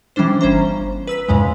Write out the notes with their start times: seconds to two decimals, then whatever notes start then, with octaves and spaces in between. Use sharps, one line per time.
0.16 E3 G3 C#4 D4 C5
0.41 G1 C#4 C5 A#5
1.07 B4 E6 B6
1.28 E2 G#2 C#3 G#3